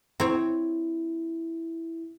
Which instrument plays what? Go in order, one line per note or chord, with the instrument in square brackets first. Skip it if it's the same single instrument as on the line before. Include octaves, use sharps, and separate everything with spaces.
[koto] C4 C#5 [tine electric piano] E4